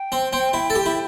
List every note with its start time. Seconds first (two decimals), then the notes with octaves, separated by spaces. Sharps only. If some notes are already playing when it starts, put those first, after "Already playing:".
Already playing: G5
0.12 C4
0.33 C4
0.53 E4
0.70 A4
0.75 G4
0.86 E4